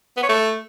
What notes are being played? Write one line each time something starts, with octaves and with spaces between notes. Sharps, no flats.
B3
C#5
A3